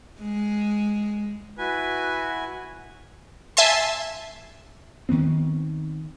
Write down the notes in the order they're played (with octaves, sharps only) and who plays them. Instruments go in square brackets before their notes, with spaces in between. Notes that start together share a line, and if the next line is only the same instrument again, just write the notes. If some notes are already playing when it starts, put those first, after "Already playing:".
[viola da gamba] G#3
[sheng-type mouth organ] E4 F#4 G#5 [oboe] B4
[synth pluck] E5 G#5 A5 C6
[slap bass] D#3 F3 B3 C4